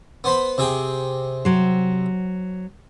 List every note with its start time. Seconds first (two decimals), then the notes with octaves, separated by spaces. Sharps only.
0.24 B3 C5 B5
0.58 C3 G#4 G5
1.45 F#3 C5